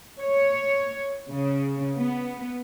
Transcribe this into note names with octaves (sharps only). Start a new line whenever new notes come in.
C#5
C#3
B3